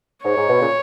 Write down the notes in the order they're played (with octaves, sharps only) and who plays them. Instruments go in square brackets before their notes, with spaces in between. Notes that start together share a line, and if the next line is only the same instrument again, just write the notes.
[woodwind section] G#2 [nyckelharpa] C#5
[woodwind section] G#2
B2
A#2 C#3